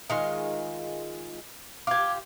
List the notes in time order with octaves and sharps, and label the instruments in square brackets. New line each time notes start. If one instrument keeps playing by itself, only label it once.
[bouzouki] D#3 G#3 F4
[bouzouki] F4 G4 [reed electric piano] D6 G#6